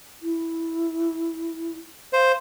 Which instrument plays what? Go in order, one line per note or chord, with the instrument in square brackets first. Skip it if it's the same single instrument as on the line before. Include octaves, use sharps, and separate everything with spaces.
[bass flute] E4
[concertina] C5 [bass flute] F5